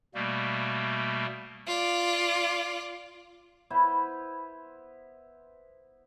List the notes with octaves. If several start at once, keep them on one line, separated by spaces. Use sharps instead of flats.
B2 G3 A3 A#3
F4 D5
B3 E4 C5 B5